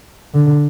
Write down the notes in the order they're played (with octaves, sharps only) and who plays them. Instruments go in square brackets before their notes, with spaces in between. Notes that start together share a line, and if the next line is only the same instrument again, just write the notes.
[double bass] D3